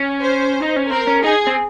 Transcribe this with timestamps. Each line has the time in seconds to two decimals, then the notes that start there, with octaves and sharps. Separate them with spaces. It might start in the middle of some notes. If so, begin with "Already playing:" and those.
Already playing: C#4
0.22 C5
0.62 D#4
0.76 C#4
0.91 C4 A#4
1.07 C#4
1.24 D#4 G#4
1.47 C4